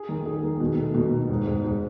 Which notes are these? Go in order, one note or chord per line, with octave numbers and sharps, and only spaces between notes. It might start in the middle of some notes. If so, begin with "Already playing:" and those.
Already playing: G#4
D#3
G#4
D#3
B2
A3
B2
D#4
G#2
G#2
G#2